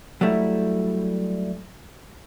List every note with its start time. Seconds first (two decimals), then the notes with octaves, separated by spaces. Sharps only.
0.21 F#3 G3 A3 E4